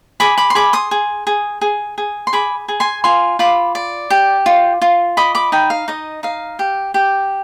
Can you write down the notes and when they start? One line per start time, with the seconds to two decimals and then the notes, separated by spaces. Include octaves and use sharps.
0.20 G#4 B5 D6
0.38 B5 D6
0.50 C6
0.55 G#4 B5 D6
0.73 C6 D#6
0.91 G#4
1.27 G#4
1.61 G#4
1.98 G#4
2.27 C6
2.33 G#4 B5 D6
2.68 G#4
2.80 G#5 C6
3.04 F4 G#5 C6
3.39 F4 B5 D6
3.75 D5
4.10 G4
4.46 F4
4.82 F4
5.17 D#5 B5 D6
5.35 B5 D6
5.52 D#4 G5 B5
5.70 F5
5.88 D#4 D#5
6.23 D#4 F5
6.59 G4
6.94 G4